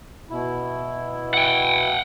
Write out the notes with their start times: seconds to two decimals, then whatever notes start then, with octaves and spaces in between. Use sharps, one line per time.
0.30 B2 E4
1.34 F#5 G5